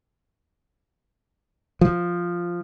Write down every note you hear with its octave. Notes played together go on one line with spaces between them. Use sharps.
F3